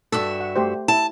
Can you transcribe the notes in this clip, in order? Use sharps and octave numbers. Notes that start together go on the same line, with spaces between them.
G2 F#4 A4 E5
F#5
A3 G4 C5
E4 A5